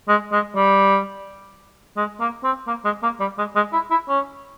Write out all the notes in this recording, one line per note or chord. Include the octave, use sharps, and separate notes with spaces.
G#3
G#3
G3
G#3
A#3
C4
A#3
G#3
A#3
G3
G#3
G#3
E4
E4
C#4